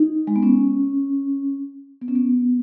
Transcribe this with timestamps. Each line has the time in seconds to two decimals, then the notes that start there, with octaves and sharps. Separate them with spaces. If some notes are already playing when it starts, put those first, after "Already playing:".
Already playing: D#4
0.27 G#3
0.36 B3
0.43 C#4
2.02 B3
2.08 C#4
2.15 B3